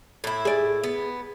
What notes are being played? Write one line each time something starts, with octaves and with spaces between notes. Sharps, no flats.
A2 E4
G#4 D5
B3